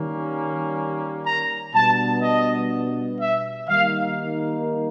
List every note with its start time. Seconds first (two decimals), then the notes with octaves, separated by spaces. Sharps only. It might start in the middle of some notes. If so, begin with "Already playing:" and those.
Already playing: D#3 G3 A#3 C#4
1.25 A#5
1.74 B2 G3 B3 D4 A5
2.22 D#5
3.21 E5
3.68 D#3 G3 A#3 D#4 F5